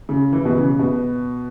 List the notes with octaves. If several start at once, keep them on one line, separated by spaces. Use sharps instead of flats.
C#3
E3
B2
C#3
B2